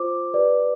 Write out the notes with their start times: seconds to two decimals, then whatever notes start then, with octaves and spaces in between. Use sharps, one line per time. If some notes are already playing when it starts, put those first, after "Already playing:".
Already playing: F4 C5 D6
0.34 G4 B4 D5